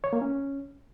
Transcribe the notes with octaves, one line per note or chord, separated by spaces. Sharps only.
C#5
A#3
C#4